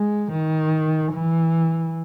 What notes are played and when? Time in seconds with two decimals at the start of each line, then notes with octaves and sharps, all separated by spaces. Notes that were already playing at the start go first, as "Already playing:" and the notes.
Already playing: G#3
0.32 D#3
1.13 E3